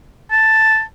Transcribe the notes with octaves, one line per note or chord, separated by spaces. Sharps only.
A5